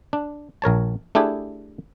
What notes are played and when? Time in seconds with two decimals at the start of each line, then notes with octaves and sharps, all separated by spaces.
0.13 D4
0.62 A#1 A#4 C#5 A5
1.15 A3 D4 E4 G4 G#4